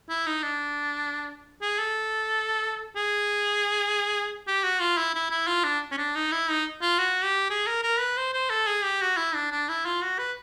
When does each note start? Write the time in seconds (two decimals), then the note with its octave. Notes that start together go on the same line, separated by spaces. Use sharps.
0.10 E4
0.27 D#4
0.43 D4
1.62 G#4
1.79 A4
2.96 G#4
4.48 G4
4.63 F#4
4.81 F4
4.98 E4
5.15 E4
5.31 E4
5.47 F4
5.64 D4
5.91 C#4
5.98 D4
6.16 D#4
6.32 E4
6.49 D#4
6.82 F4
6.99 F#4
7.24 G4
7.50 G#4
7.67 A#4
7.83 A#4
8.00 B4
8.17 C5
8.34 C5
8.50 A4
8.67 G#4
8.84 G4
9.02 F#4
9.17 E4
9.35 D4
9.52 D4
9.69 E4
9.86 F4
10.02 F#4
10.19 B4